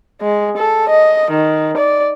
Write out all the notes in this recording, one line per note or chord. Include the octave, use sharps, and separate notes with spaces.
G#3
A4
D#5
D#3
D5